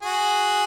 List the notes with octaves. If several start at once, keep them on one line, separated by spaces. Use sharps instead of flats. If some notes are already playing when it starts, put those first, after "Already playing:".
F#4 G#4